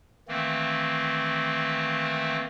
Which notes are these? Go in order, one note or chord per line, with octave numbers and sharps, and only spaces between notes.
D#3 E3 A3 A#3 C4